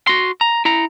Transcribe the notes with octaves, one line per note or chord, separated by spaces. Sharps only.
F#4 C6
A#5
E4 A#5